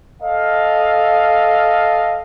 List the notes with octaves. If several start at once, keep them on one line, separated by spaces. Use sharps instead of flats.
A4 D#5 F5